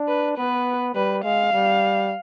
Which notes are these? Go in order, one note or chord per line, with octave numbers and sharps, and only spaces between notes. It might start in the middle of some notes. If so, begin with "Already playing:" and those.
Already playing: D4
B4
B3 B4
G3 B4
G#3 F5
G3